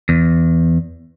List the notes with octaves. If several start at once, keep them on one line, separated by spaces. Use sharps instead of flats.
E2